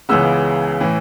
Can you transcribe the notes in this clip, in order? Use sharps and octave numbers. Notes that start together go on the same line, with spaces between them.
C#2 C#3 E3 G#3 B3 E6
A2 E3